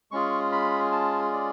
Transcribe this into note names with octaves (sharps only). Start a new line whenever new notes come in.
G#3 C#4 F4 G#4 C#6
B5
A5
D5